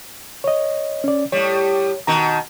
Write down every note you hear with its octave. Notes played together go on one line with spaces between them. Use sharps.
C#5 D#5
C#4 D5
A2 G3 C#5
B2 D#3 A#5